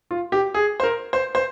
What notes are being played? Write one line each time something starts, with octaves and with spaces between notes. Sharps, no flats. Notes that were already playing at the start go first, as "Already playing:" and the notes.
F4
G4
G#4
C5
A#4
C5
C5